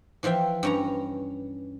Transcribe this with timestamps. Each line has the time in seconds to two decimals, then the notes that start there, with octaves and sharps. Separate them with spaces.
0.23 E3 F3 F4 E5 G5
0.63 G2 C#4 A#5